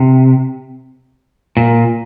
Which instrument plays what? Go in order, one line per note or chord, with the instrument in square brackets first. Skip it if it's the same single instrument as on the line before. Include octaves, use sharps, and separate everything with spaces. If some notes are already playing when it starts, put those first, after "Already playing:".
Already playing: [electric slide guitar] C3
A#2